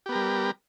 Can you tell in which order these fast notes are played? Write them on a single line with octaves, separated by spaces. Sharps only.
G4 B3 A#4 G3